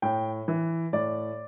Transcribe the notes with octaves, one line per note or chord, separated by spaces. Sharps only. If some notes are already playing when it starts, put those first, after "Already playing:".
A2 G5
E3
A2 D5